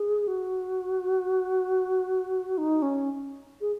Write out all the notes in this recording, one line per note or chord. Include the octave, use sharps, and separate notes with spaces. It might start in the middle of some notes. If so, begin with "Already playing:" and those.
Already playing: G#4
F#4
D#4
C#4
G#4